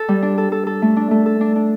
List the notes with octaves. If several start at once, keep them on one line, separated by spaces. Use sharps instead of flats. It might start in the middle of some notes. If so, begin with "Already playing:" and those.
Already playing: A4
G3
D4
A4
A4
A4
A3
D4
A3
A4
D4
D4